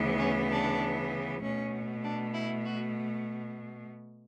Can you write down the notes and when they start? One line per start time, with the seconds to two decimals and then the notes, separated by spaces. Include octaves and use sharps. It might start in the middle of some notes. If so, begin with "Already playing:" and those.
Already playing: D2 C#3 E3 B3
0.18 C#4
0.49 D4
1.42 B2 A3 C#4
2.03 D4
2.33 E4
2.65 F#4